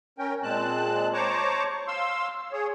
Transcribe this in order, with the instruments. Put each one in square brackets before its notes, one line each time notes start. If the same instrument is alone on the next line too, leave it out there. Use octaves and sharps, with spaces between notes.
[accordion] C#4 A#4 G5
A#2 G#3 C4 A5 F#6
C5 C#5 A5 A#5 C#6 D6
F5 C6 E6
G#4 C#5